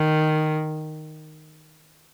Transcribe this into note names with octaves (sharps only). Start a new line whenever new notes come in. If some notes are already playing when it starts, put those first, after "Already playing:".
Already playing: D#3